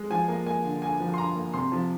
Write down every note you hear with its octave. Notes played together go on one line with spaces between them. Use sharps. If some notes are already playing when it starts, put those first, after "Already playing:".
Already playing: G#3
F3 G#5
A#3
A#3 G#5
D3
G2 G#5
F3
C6
G2 A#5
A#3
C3 C6
F3